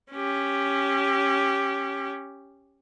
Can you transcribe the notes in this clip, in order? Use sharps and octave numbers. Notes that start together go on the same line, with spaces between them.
C#4 G4